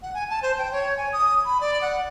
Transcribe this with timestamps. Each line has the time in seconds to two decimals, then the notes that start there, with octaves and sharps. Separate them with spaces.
0.02 F#5
0.14 G#5
0.30 A5
0.43 C5
0.58 G5
0.72 C#5
0.97 G#5
1.13 D#6
1.45 B5
1.61 D5
1.82 F#5